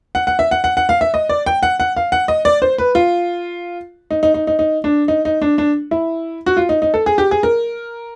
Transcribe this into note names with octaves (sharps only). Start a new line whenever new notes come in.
F#5
F#5
E5
F#5
F#5
F#5
F5
E5
D#5
D5
G5
F#5
F#5
F5
F#5
D#5
D5
C5
B4
F4
D#4
D#4
D#4
D#4
D#4
D4
D#4
D#4
D4
D4
E4
F#4
F4
D#4
D#4
A4
G#4
G4
G#4
A#4